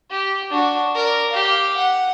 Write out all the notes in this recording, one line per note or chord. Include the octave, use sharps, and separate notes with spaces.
G4
D4 F#4
A#4 D5
G4 F5
F#5